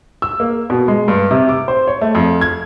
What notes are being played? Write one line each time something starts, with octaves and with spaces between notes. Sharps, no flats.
E6
A#3
B2
G#3
G2
C3
D6
C5
C#5
A3
F2
G#6